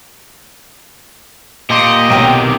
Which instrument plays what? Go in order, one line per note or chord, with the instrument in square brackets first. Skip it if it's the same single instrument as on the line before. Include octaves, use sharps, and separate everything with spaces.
[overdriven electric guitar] A#2 [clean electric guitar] G4 C6 [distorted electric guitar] D#5
[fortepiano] B1 G5 [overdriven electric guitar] C3 D#3